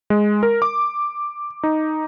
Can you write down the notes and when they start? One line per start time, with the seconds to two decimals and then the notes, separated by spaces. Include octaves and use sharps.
0.10 G#3
0.43 A#4
0.62 D6
1.63 D#4